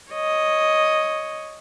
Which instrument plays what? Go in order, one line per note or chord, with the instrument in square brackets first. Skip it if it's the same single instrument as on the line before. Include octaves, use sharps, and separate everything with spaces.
[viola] C#5 D#5